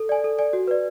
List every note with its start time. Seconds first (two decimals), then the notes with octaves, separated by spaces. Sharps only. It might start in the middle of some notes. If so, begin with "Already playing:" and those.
Already playing: A4
0.09 D5 G#5
0.24 A4
0.39 D5 G#5
0.53 F#4
0.68 B4 D5